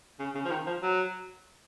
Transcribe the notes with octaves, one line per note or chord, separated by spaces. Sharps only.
C#3
C#3
F3
D#3
F3
F#3